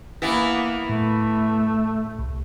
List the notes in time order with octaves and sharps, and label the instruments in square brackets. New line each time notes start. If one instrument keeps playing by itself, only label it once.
[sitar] E3 B3 E4 [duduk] A#3
[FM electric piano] A2 [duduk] A3
[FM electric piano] C2